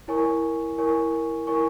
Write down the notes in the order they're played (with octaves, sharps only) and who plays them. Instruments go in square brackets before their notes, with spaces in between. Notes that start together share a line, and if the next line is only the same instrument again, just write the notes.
[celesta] E4 A#4 C#5 G#5 C#6
E4 A#4 C#5 G#5 C#6
E4 A#4 C#5 G#5 C#6